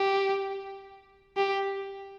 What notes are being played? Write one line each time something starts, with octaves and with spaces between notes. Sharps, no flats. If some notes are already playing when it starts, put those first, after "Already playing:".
Already playing: G4
G4